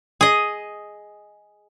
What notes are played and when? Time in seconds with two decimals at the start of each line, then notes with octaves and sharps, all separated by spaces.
0.21 G#4 D#5